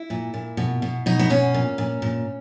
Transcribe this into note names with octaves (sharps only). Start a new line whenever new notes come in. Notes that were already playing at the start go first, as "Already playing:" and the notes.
Already playing: E4
A#2
A#2
B2
B2
B2 D#4
B3
B2 C#4
A#2
A#2
A#2